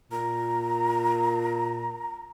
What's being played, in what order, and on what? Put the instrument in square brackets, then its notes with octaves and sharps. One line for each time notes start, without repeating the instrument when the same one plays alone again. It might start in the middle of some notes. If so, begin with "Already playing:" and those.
[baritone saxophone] A#2 [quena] A#5